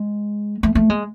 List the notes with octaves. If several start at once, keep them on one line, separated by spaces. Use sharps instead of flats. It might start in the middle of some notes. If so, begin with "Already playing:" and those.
Already playing: G#3
A3
A3
G#3